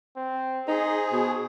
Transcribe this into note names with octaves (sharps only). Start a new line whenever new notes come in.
C4
D#4 G#4 C5
B2